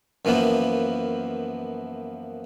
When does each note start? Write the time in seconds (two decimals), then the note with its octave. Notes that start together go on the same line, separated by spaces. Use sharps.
0.25 F#2 E3 F3 A#3 B3